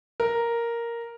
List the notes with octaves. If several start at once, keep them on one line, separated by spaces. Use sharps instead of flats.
A#4